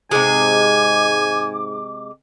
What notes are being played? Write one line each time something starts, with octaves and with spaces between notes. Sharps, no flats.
G#2 C3 G#3 G#5 D6